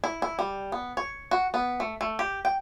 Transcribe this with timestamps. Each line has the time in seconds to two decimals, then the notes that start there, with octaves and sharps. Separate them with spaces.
0.04 E4
0.22 E4
0.39 G3
0.72 B3
0.97 C#5
1.31 F#4
1.54 B3
1.80 A3
2.01 A3
2.19 G4
2.45 G5